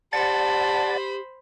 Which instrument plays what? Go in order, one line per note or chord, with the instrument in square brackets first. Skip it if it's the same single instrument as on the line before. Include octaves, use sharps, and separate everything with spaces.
[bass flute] G4 [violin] C5 B5 [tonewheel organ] D5 F#5 A6 [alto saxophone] A5